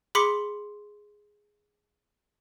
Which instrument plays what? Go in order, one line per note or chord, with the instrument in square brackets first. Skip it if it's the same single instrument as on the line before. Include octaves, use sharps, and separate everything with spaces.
[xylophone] G#4 B5 C6 D6 B6 C#7